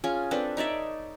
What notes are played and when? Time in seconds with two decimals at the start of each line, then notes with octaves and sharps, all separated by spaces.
0.04 C#4 F4 G#4 G#5
0.31 C4 D4 A4 B4
0.57 D#4 C#5 D5 E5